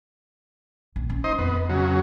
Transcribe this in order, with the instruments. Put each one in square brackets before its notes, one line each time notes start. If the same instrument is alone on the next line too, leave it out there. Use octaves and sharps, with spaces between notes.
[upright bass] A#1
C#4
[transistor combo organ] D#4 C5 D#5
[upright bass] F2 [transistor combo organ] B3
[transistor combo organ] C#3 F#3